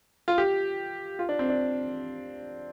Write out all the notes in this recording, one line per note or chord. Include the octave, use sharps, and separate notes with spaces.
F4
G4
F4
D4
C4
D4